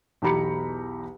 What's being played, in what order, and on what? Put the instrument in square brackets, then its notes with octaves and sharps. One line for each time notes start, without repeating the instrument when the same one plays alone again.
[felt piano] B1 E2 G4 A#5 B5 C#7